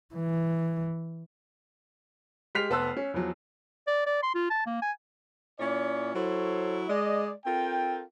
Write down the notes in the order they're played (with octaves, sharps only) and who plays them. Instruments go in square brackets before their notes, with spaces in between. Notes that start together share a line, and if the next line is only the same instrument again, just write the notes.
[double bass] E3
[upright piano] G#3 G4 F6 B6 C7 F7
F1 B3 A5 C6 E6 F#6
C#4
E2 F3 F#3
[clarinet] D5
D5
C6
F4
A5
A#3
G#5
[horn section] A#2 C#4 E4 C#5 D5
F#3 E4 A4 C5 C#5
G#3 D5 D#5
C4 F4 A4 A#4 G5